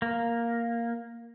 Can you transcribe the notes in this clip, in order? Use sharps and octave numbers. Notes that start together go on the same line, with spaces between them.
A#3